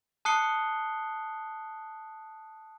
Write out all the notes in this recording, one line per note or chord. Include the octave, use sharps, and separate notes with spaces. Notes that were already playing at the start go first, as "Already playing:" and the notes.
A5 D#6 F#6 C7 C#7 G7